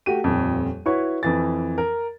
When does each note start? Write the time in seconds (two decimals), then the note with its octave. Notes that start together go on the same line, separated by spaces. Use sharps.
0.06 A3 F#4 G4 D#7
0.24 D#1 F2
0.86 E4 F#4 B4 C#5 C#6
1.23 F2 E3 A6
1.78 A#4